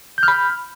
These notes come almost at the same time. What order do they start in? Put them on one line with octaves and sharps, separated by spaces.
G6 F6 B5